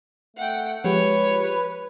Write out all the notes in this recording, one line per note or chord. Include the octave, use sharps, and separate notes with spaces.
A3 F#5 G5
F3 G#3 G4 B4 C#5